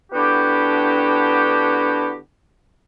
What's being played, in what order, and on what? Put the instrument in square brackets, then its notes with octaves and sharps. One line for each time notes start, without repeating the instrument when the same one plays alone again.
[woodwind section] D3 B3 D4 E4 F#4 G4